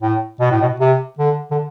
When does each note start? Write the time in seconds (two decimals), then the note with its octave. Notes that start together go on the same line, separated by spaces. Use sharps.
0.02 A2
0.40 B2
0.52 A2
0.62 B2
0.80 C3
1.18 D3
1.51 D3